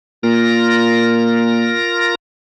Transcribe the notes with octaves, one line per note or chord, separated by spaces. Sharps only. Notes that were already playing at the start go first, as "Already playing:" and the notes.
A#2 F4 A#4 A#6